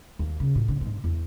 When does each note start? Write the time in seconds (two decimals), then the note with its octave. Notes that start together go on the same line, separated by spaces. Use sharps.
0.19 D#2
0.40 C#3
0.55 A2
0.68 D3
0.81 G#2 C4
1.04 E2